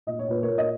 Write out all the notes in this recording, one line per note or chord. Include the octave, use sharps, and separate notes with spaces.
A#2 D#5
C#5
A#2 B4
A#4 C#5
A#2
D#5